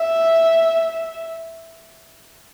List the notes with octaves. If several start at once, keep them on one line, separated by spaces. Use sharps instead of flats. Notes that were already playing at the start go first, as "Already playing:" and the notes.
Already playing: E5